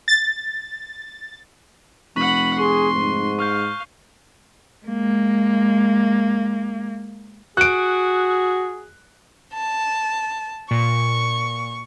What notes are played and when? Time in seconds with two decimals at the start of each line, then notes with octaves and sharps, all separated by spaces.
0.08 A6
2.16 F1 F#5 B5 C#6 F#6
2.59 G#4 C6 C#6
2.95 G#2
3.39 F5 C#6 F6 G6
4.86 G#3 A#3
7.57 F#4 G#4 F#6 D7
9.54 A5
10.71 A#2 C#6